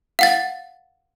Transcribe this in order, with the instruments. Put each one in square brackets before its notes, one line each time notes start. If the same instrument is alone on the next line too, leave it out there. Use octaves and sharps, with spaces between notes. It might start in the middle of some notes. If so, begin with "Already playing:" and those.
[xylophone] F5 F#5 A6